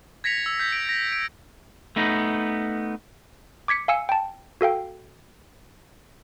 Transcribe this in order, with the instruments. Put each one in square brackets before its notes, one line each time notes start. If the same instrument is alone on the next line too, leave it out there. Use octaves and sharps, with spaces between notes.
[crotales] G#6 A#6 B6 C#7 F7
E6
G6 B6
D7
A#6
D7
[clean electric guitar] A3 B3 D#4
[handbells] D6 G#6 B6 C#7
F5 G#5 E6 C#7
G5 A5
F#4 A4 F5 G5